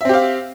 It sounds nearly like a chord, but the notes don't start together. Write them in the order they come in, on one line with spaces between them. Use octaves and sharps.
E5 C4 G4 F5